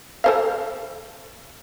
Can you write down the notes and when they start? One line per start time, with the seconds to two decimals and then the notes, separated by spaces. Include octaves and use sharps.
0.24 A4 C5 F5